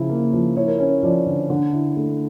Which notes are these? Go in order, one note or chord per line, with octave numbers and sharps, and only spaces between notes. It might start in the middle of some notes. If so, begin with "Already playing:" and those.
Already playing: C#3 F3 E4
A#3
F3
E4 C#5
A#4
C#4 C#5
F3 D5
D3
D3
E4
A3